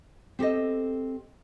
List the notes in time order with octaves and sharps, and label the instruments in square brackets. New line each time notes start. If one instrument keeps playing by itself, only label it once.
[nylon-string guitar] C4 G4 A4 D#5